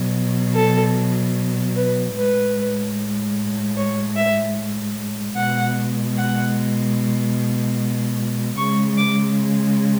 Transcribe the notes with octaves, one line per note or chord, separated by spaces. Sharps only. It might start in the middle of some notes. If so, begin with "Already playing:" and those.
Already playing: B2 F#3
A4
B4
A2 G#3 B4
C#5
E5
B2 G#3 F#5
F#5
C#3 G#3 C#6
D6